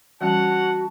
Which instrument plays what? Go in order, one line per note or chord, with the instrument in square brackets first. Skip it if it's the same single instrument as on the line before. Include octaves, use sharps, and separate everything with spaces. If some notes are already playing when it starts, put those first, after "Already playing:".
[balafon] E3 G3 C#4 [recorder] F#4 [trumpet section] C#5 F#5 [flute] A5